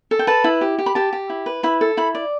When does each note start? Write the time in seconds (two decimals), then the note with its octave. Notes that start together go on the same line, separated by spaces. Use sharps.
0.11 A4
0.19 G5
0.27 B4 A5
0.44 E4
0.61 G4
0.78 G4
0.86 B5
0.95 G4 A5
1.13 G4
1.30 E4
1.46 B4
1.63 E4 B5
1.81 A4
1.97 E4 B5
2.15 D5